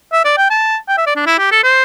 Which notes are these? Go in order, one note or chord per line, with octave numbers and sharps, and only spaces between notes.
E5
D5
G5
A5
G5
E5
D5
D4
E4
G4
A4
C5